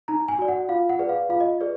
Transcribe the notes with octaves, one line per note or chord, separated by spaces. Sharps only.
D#4 A#5
G#5
F#4 D5
F#5
F4 F5
F#5
G#4 B4 D5
F5
F4 F5
D#5
G#4 B4 D5